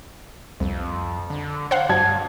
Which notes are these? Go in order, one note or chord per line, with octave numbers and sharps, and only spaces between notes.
C2 F2
D3
C5 F5 F#5
G2 F#3 A5 G#6